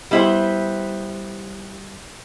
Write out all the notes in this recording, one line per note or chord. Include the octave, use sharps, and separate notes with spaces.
G3 B3 E4 G4 C5